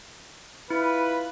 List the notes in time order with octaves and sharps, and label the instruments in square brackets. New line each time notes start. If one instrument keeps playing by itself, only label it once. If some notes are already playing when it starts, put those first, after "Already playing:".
[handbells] E4 [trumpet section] F4 B4